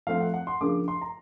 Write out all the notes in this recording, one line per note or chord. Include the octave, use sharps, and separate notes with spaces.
F3 A3 C4 F5
F#5
F#5
C6
C#3 F3 A#3 D4 D6
C6
A#5